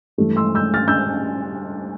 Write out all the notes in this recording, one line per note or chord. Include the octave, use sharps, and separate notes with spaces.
G2 E3 A3
C6 E6
E6 G6
F6 A6
E6 G6